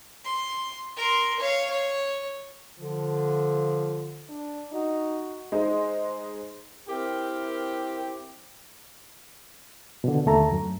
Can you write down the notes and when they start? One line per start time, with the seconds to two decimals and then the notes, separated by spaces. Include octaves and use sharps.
0.24 C6
0.97 A#4 C6
1.39 C#5 F5
1.70 C#5
2.80 D3 F3
4.29 D4
4.72 D#4 F#4
5.52 G#3 D#4 C5 D#5
6.89 C4 E4 G4 A#4
10.04 B2 D3
10.26 D#2 D3 A3 A4 A#5
10.52 F#2